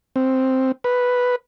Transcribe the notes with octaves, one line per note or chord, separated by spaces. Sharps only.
C4
B4